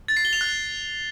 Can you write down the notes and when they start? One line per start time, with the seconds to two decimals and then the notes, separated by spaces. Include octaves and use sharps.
0.08 A6
0.17 C7
0.25 G7
0.33 F7
0.41 F#6